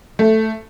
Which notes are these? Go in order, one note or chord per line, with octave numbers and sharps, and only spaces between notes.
A3